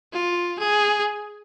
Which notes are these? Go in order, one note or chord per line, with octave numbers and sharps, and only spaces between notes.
F4
G#4